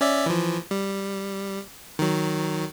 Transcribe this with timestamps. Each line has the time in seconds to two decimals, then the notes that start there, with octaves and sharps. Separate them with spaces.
0.01 C#4 D5 E5
0.26 E3 F3
0.71 G3
1.99 D#3 F#3